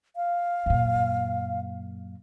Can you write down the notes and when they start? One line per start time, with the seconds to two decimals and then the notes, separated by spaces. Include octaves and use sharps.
0.16 F5
0.66 F#2 A#2